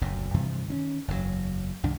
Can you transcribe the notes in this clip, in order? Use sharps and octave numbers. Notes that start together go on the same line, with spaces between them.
F#1 D2 B2
G2 C3 E3 F3
D#3 C4 C#4
F#1 E2 A#2 F#3
C2 G2 D#3 D4